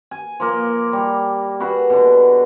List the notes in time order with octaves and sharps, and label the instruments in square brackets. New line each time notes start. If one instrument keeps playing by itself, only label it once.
[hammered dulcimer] G#5
F3 A#3
G3
F#4 G#4 B4 E5
B2 D3